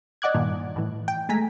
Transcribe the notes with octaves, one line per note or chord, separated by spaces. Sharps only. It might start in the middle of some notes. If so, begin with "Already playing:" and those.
D5 D#5 F#5 D6 F#6 G#6
G2 A#2 D#3
A2 E3
G5
G#3 A3 G#5 A#5 B6